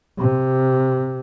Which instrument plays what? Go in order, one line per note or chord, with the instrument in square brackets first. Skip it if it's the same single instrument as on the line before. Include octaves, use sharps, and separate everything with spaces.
[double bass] C3